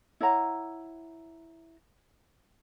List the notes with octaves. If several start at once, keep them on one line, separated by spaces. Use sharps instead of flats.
E4 C#5 F#5 A#5